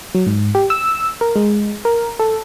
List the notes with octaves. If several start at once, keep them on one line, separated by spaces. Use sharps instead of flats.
F#3
G#2
G4
E6
A#4
G#3
A#4
A4